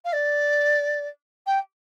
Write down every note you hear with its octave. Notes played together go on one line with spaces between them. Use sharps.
F5
D5
G5